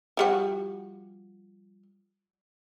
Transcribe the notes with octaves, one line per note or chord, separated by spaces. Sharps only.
F3 G3 F#4